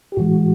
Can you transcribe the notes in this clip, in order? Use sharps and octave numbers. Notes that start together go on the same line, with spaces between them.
G4
A2 E3 G#3 F#4